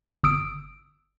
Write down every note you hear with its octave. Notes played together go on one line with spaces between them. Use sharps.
G1 D#6 E6 D7